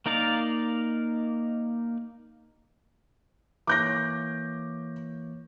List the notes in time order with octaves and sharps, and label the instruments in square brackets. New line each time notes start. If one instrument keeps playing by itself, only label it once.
[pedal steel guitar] A#3 D#4 A#4 D5 F5
[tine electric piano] E3 A#3 C#5 [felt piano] D6 G6 A#6